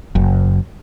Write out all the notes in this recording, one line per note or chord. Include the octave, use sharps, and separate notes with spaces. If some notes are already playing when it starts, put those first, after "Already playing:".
F#1 F#2